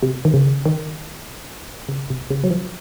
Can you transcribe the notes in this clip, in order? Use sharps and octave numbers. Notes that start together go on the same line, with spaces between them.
C3
D#3
C#3
D#3
C#3
C3
C#3
F#3
F3